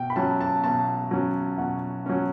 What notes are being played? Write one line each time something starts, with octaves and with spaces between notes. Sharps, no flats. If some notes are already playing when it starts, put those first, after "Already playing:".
Already playing: B2 G5
B5
F#3 C#4 A5
A5
B2 A5
F#3 C#4
B2 F#5
F#3 C#4